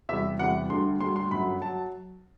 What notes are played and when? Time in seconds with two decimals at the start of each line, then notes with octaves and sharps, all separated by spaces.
0.09 E2 C3 E3 G3 E5
0.39 E2 C3 E3 G3 F#5
0.70 D2 D3 G3 C6
1.00 D2 D3 G3 C6
1.16 C6
1.31 G1 F#2 F#3 B5
1.62 F#3 A5